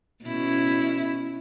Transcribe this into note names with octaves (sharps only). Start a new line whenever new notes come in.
B2 C#4 E4